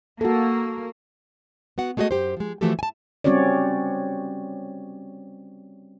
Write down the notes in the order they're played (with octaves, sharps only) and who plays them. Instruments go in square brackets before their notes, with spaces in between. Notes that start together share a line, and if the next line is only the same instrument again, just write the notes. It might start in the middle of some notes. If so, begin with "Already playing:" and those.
[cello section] A#3 [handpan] F#4 A4
[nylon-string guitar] B3 F#4 F#5
G#3 A3 F#4 G#4 D#5
F#2 G4 C5
F3 G#3
E3 F3 A3 F#4 G4 A4
G#5 A5
[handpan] G3 C4 C#4 F#4 C#5 D5